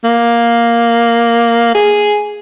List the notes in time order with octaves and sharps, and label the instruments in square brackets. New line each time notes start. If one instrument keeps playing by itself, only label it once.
[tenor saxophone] A#3
G#4